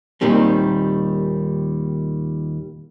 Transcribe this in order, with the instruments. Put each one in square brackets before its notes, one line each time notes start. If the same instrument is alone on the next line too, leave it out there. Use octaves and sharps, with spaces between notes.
[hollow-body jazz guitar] D#2 A#2 D#3 G3 C4